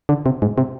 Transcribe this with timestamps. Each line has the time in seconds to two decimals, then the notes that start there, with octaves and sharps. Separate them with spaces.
0.09 D3
0.26 C3
0.42 G#2
0.58 C3